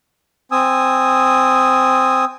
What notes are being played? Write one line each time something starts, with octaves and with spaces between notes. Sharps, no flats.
C4 G#5 D#6 E6